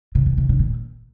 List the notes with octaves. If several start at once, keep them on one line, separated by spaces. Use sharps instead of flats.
C3
B2
C3
C#3
A#2